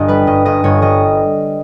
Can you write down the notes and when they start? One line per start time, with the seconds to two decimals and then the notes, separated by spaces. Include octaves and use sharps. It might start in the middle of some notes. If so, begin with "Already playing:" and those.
Already playing: G1 G2 D#5
0.08 G3 B4
0.27 G2 D#5
0.45 G1 D#5
0.64 G1 C#5
0.82 G3 D#5